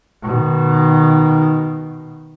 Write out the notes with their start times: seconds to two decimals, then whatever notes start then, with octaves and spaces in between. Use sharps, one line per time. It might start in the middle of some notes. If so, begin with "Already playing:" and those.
0.23 B2 D#3